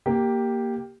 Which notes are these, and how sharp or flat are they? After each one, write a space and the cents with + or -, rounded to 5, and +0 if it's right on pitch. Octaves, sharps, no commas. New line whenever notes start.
A#3 +0 G4 +0